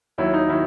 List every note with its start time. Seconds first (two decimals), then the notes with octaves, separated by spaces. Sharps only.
0.18 D#2 D#3 F#3 E4
0.34 D#4
0.49 D#3 F#3 E4